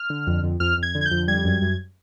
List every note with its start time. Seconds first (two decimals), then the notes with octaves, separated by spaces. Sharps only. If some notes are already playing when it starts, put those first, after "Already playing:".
Already playing: F6
0.10 D3
0.27 F2
0.43 F2
0.60 F2 F6
0.77 F2
0.83 G#6
0.95 D3
1.01 G#6
1.06 G6
1.11 F2
1.28 G3 G#6
1.45 F#2
1.62 F#2